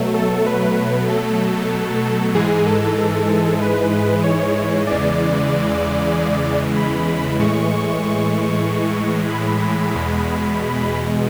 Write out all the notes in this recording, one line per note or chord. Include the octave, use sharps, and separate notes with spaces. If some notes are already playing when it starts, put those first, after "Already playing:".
Already playing: B2 F#3 A3
A4
B4
A4
G#2 E3 G#3 G#4
A4
A4
B4
C#5
E2 C#3 E3 G#3 D5
B5
A2 E3 G#3 C#6
C#6
B5
E2 B2 G#3